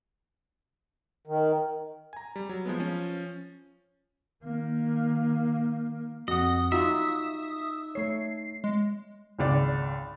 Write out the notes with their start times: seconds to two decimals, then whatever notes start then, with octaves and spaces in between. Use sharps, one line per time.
1.27 D#3
2.13 G#5 A#5
2.36 G3
2.49 F#3
2.65 F3 G#3 B3
2.80 F3 C#4
4.44 D#3 A#3
6.28 F2 F#4 D#5 F#5 D#6
6.72 D#4 F4 F#4 E5
7.95 A3 C#5 C7
8.64 G#3
9.39 G#1 C#2 D5